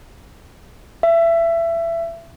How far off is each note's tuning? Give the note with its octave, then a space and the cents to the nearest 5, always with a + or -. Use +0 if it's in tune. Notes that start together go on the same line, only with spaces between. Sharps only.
E5 +25